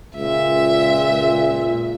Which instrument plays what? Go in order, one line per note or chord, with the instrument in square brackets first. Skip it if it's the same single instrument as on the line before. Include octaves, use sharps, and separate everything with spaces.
[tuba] C#2 [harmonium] A#2 [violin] E5